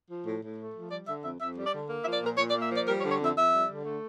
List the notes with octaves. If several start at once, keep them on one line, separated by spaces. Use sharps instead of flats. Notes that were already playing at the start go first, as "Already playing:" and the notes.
F3
A2
A2
A3
F3
G3 D5
D3 E5
F2 E5
F2 E5
G3
D5
D3
A#3
E5
F3
D5
A#2 A#4
A#2 C#5
D5
A#3
E5
F3 D5
G3 A#4
C#5
D3
C#5
F2 E5
F2 E5
G3
D3
A3